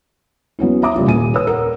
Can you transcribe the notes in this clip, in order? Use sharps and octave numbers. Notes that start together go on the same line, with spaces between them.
F#3 B3 C#4 E4
E5 A#5 D6 D#6
F#1 G3 F4
D#1 G#5 D#7
B4 C#5 E6
A#4 F#5